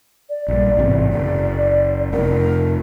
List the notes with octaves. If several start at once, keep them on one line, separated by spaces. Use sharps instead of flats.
D5
A#1 G2
A1 G#2 C3
F#1 D5
F1 A#4